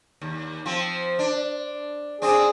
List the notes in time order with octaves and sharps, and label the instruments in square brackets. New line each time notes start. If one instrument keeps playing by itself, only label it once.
[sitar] D#2
F3 C4
D4
[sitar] C4 D4 [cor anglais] G#4